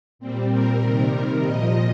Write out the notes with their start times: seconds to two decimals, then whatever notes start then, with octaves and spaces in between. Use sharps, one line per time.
0.19 A#2 G3 C4
0.50 A#4
0.81 C3 D#3 G3
1.42 A#2 F3 D#5